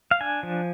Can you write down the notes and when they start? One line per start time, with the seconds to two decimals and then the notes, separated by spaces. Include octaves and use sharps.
0.11 F5
0.21 D4 G#5
0.43 F3